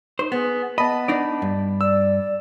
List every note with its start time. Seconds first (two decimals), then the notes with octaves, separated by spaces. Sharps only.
0.19 D#4 C5
0.32 B3 G#4
0.78 B3 D#5 A5 B5
1.08 D4 D#4 D5
1.42 G2
1.81 D5 E6